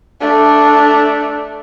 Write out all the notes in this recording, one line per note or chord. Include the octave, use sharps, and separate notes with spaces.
A3 D4